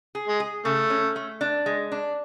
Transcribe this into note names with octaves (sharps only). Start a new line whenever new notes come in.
G#4
G#3
G#4
C#3 A3
C#4
A3
D4
G#3
D4